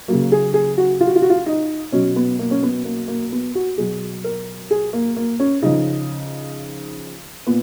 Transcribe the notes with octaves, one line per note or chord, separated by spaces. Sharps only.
C#3 F#3 A#3
G#4
G#4
F#4
F4
F#4
F4
F#4
F4
D#4
B2 F#3 C#4
B3
A#3
C#4
B3
A#3
A#3
B3
F#4
B2 F#3 G#4
A#4
G#4
A#3
A#3
C#4
C#3 F3 D#4
A#2 B3